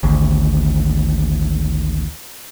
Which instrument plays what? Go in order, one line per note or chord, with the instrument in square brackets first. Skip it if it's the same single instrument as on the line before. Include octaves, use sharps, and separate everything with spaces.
[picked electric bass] G#1 D2